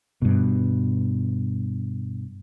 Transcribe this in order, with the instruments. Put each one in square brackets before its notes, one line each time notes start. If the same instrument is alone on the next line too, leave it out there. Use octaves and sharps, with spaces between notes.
[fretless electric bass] G2 B2